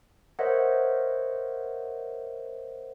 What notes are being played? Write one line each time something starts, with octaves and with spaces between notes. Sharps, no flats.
A#4 C5 C#5 D#5 E5 F#5